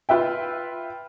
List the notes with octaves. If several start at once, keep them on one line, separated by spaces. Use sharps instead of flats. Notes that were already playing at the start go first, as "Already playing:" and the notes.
F4 B4 E5 G5